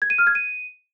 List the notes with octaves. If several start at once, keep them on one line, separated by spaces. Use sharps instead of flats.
G#6
D#7
F6
G#6
D#7